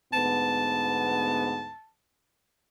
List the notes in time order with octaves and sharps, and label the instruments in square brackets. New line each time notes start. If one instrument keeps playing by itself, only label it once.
[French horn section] D2 G#2 B3 [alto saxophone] A5